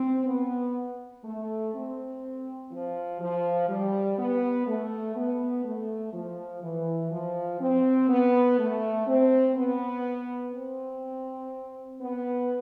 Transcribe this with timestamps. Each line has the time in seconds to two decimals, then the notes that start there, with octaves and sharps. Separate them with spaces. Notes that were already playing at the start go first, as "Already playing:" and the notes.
Already playing: C4
0.26 B3
1.24 A3
1.73 C4
2.71 F3
3.20 F3
3.69 G3
4.18 B3
4.67 A3
5.16 B3
5.64 A3
6.13 F3
6.62 E3
7.11 F3
7.60 C4
8.09 B3
8.58 A3
9.07 C4
9.55 B3
10.53 C4
12.00 B3